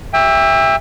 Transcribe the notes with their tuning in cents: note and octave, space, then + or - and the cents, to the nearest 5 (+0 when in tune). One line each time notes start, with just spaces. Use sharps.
G4 -40 E5 +0 G5 +35